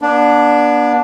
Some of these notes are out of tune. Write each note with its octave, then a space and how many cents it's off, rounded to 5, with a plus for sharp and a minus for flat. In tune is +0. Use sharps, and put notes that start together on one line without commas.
B3 -45 D4 +0